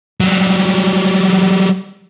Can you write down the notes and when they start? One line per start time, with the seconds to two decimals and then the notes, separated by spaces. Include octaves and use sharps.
0.20 F#3 G3